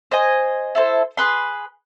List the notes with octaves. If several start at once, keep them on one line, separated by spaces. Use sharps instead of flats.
C5 D#5 G#5
E4 A4 C5
G#4 B4 C6